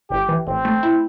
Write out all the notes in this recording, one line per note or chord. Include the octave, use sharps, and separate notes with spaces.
G1 G4
E3
A1 C4
A3
E4